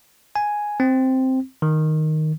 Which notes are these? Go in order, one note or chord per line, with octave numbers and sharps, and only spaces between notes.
G#5
C4
D#3